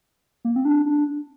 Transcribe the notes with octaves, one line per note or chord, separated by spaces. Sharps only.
A#3
C4
D4
D4